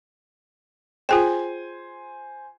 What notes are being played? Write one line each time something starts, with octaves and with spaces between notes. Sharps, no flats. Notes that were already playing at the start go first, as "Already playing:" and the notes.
F4 G#4 C5 G5 G#5